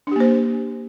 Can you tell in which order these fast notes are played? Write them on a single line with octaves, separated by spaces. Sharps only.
D4 G4 A#3 C5